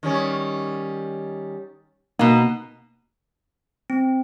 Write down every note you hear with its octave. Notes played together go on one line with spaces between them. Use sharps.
D#3 G3 C#4
B2 A#3 D#4
C4